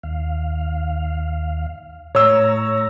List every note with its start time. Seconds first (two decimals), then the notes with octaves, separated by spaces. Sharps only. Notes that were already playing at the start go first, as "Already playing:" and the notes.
0.03 D#2 F5
2.15 A2 C#5 A#5 E6